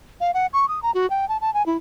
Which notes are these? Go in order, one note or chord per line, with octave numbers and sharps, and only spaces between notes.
F5
F#5
C#6
D#6
A#5
F#4
G5
A5
A5
G#5
E4